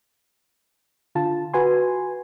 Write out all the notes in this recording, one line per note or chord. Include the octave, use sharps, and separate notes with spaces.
D3 F4 A5
F#4 B4 G#5 C6